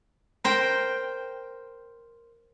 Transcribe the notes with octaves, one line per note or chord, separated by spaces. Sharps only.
A#4 C5 G5